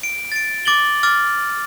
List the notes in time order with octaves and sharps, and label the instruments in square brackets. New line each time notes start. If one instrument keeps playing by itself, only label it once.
[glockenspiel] D7
A6 D7
D6 A6 F#7 G7
D6 F6 A6